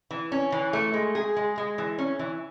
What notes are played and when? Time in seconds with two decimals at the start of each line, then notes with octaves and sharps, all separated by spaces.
0.11 E3
0.32 C#4
0.52 E3
0.73 A3
0.94 G#3
1.15 G#4
1.37 G#3
1.58 G#3
1.78 E3
1.99 C#4
2.19 E3